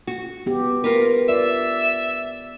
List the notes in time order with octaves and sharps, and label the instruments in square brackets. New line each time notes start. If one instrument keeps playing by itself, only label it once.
[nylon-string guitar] F#4
[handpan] B3 G4
[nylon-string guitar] F4 A#4 B4
[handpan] D5 [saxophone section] E5